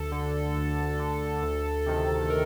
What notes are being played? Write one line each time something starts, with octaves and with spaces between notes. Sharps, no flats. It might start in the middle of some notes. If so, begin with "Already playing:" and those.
Already playing: D2 A4
D3
D2
D3
D2
C3 D#3
A#4